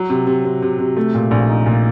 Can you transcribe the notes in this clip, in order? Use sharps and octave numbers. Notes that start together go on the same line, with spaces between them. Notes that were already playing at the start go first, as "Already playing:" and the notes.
Already playing: F#3
C3
C3
C3
C3
C3
A3
A#2
A#1
D#4
A#2